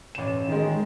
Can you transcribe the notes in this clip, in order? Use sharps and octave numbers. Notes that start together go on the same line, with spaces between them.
A1 E7
D#3 G#3